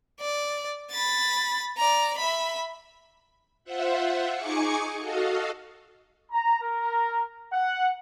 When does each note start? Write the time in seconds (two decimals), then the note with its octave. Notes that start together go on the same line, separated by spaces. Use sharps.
0.20 D5
0.91 B5 A6
1.78 D5 A#5
2.18 E5 B5
3.64 F4 C5 E5 F#5
4.34 D#4 G#4 G#5 C#6 D6 C#7
4.97 F#4 A4 D#5 F5
6.30 A#5
6.60 A#4
7.51 F#5